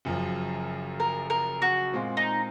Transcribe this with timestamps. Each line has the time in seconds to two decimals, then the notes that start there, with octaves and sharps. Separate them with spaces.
0.05 F#1 F#2 F3
1.00 A#4
1.30 A#4
1.62 F#4
1.93 A#2 G#3 C4 F4
2.17 D#4